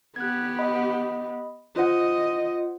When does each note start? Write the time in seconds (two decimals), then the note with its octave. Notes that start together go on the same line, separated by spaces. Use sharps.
0.16 B3 G4 F#6 G#6
0.59 D#5 B5
1.76 F4 C5 D#5 F#5